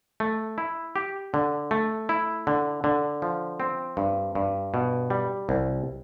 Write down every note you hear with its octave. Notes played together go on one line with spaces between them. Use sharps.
A3
E4
G4
D3
A3
E4
D3
D3
F3
C4
G2
G2
B2
G3
C2